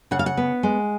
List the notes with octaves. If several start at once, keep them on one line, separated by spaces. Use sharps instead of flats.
C#3 F#5
F5
F#5
B3
G#3